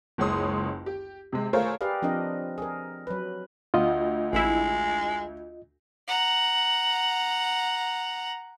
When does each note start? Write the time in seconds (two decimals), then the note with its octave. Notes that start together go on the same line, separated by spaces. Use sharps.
0.18 F#1 C#2 C#5 C6 D#6
0.86 G4
1.32 C3 G#3
1.53 A3 F4 G#4 A#4 C5 C#5
1.81 G4 G#4 A#4 B4 D5 F5
2.02 F3 C4 D4 A#4 D#5
2.58 G#4 A#4
3.07 F#3 B4
3.74 D2 F4 D#5
4.33 A1 G#3 E4
6.08 F#5 A#5